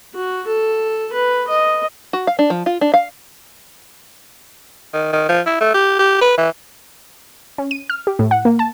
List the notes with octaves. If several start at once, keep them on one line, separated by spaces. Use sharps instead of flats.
F#4
A4
B4
D#5
F#4
F5
D4
F3
F4
D4
F5
D#3
D#3
F3
E4
A3
G4
G4
B4
E3
C#4
D#7
F6
G4
A2
F#5
A#3
A5